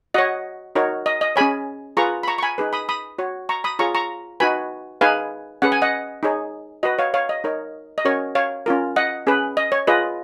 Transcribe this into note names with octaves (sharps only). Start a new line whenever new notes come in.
F#4 C#5 D#5 F#5
D#4 F#4 A#4 C#5
D#5
D#5
C#4 G#4 C#5 G#5 B5
F4 G#4 B4 A#5 C#6
B5
A#5 C#6
C#6
G#5 B5
D#4 G#4 B4
B5 D#6
B5 D#6
F#4 C#5
A#5 C#6
B5 D#6
F4 G#4 C#5 A#5 C#6
A#5 C#6
D#4 F#4 B4 G#5 B5
D#4 G#4 B4 F5 G#5
C#4 G#4 B4 F#5
G#5
D#5 F#5
D#4 G#4 C#5
F#4 B4 D#5
C#5 F5
C#5 F5
D#5
D#4 A#4 C#5
D#5
C#4 F#4 A#4 C#5
C#5 F5
C#4 F4 A#4
D#5 F#5
C#4 G#4 B4
D#5
C#5
F4 G#4 B4 D#5